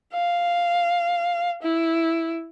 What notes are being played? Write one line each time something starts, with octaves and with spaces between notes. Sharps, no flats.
F5
E4